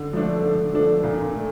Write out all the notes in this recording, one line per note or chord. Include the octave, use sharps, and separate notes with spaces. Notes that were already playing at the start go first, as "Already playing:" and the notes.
Already playing: D3
F3 A3 D4 A4
D3
F3 A3 D4 A4
A#2
A3